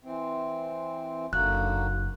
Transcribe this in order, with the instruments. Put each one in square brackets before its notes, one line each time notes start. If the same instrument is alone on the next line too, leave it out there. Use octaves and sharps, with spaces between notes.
[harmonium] E3 C4
[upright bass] F#1 D#4 [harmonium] D3 A#3 F#4 [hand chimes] F#6